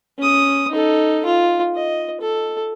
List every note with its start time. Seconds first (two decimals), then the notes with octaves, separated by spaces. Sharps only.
0.18 C#4 D#6
0.71 D#4 A4
1.26 F4
1.75 D#5
2.21 A4